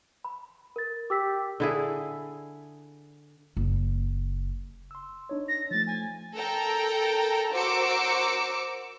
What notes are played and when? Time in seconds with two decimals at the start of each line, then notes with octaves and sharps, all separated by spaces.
0.24 B5
0.76 A#4 A6
1.10 G4 D6 E6 B6
1.60 D3 E4 G#4
3.57 F#1
4.91 C6 E6
5.29 D4 D#4 C#5
5.48 A#6
5.71 F3 A3 A6
5.87 G#5
6.37 A4 A#4 G5 A#5
7.53 F#4 A#4 C5 D6 E6 C#7